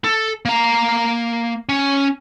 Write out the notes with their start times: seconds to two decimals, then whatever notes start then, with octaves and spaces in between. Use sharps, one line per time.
0.04 A4
0.45 A#3 A#5
1.69 C#4